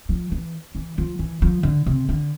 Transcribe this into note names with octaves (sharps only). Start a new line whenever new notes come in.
F3
E3
E3
F3
E3
F3
D3
C3
D3